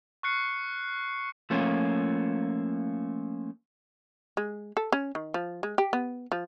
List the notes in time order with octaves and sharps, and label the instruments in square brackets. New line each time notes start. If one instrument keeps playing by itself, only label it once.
[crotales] C#6 F6 F#6 C7 C#7
[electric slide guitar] F3 A3 A#3 C#4 F4
[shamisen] G#3
A4
C#4
D#3
F3
G#3
G4
B3
F3